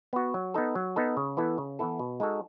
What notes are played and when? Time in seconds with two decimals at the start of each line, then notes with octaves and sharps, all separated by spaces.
0.13 B3 F#4
0.34 F#3
0.54 B3 D#4 A4
0.75 F#3
0.96 B3 D#4 A4
1.17 C#3
1.37 E3 B3 E4 A4
1.58 C#3
1.79 E3 B3 E4 A4
1.99 B2
2.20 G#3 D#4 F#4 A4